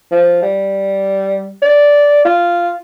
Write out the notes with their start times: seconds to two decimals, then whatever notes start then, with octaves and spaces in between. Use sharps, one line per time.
0.12 F3
0.43 G3
1.62 D5
2.25 F4